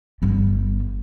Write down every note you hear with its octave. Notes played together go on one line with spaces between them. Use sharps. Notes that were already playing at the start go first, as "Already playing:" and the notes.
G1 G3